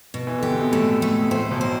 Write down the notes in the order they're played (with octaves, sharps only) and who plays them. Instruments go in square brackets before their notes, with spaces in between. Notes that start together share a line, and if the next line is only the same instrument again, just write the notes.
[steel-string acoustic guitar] B2
[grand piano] E3
[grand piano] D3 [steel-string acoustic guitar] G4
[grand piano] C3
B2
[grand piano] A2 [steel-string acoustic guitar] A3
[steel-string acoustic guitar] A3
[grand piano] B2
[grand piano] A2 [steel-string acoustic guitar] C5
[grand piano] B1 B2
[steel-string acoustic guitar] C5